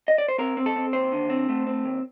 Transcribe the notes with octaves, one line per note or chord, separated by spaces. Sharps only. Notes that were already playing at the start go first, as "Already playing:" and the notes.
D#5
D5
C5
C4 A#4
C4
A4
C4
D#2 C5
D3
C4
A3
C4
D#2